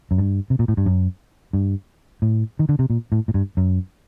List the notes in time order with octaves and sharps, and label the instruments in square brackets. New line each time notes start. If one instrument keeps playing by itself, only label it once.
[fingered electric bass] F#2
G2
C3
A#2
A2
G2
F#2
G2
A2
D#3
D3
C3
A#2
A2
A2
G2
F#2